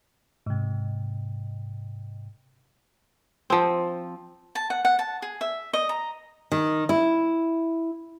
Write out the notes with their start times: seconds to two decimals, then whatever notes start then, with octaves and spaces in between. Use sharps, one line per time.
0.46 G#2 C3
3.50 F3 C4
4.55 A5
4.70 F#5
4.85 F#5
4.99 A5
5.22 G#4
5.41 E5
5.73 D#5
5.89 A#5
6.52 D#3
6.89 E4